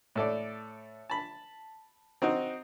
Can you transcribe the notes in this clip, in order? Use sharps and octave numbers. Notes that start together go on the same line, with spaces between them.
A2 A4 D5
A5 B5
C4 D#4 F#4